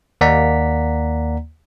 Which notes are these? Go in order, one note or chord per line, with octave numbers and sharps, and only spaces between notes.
D#2 A#3 D5 F#5 A#5 B6